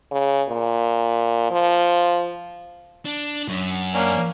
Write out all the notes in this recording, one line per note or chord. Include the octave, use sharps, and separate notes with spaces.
C#3
A#2
F3
D4
F#2
A#3 C#4 D4